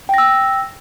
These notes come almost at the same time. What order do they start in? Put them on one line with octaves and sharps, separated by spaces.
G5 A#6 E6